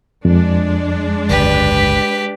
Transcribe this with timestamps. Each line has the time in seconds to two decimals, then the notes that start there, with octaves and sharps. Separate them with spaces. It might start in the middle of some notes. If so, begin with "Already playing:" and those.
0.25 F2 G#3 D4
1.29 G1 C#2 D3 G4 B4